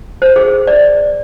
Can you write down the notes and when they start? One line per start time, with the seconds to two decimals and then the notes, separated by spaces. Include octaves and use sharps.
0.22 C5
0.36 G#4
0.67 D5